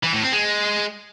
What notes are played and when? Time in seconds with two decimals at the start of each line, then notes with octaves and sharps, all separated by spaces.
0.03 E3
0.13 A2
0.23 C4
0.32 G#3